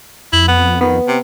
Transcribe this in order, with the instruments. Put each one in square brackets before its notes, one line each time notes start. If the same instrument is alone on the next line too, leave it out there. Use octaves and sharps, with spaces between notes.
[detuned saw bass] F2 [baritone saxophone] E4
[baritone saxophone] B3
[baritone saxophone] D#3 [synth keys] B3
[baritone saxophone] C3